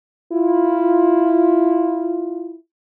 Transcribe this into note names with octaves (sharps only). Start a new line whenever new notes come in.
E4 F4